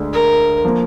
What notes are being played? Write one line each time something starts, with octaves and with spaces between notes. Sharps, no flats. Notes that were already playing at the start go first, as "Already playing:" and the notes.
Already playing: D2 D3 G#3 D4 G#4
A#4
F3 A#3